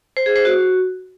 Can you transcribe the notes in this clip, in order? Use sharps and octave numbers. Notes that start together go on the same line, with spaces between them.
C5
G#4
C5
F#4